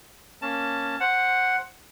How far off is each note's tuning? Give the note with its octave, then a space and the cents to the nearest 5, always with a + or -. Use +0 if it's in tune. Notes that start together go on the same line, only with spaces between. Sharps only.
A#3 +0 C#4 +0 A5 +10
C5 +10 F#5 +0